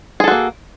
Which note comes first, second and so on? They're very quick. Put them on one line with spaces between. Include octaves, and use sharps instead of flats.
G#4 A4 F#4 A#3